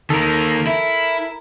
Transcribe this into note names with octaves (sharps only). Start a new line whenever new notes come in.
D#3 A#3 A4 A#4
E4